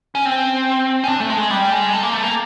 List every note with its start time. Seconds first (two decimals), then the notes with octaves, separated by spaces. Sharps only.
0.15 C#4
0.25 C4
1.04 C#4
1.08 D4
1.20 A3
1.30 G#3
1.50 G3
1.72 G#3
1.93 A3
2.02 A#3
2.13 A3
2.23 A#3